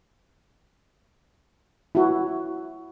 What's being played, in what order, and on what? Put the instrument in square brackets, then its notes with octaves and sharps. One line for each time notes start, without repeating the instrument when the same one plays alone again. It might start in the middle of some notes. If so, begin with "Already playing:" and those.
[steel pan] E4 F#4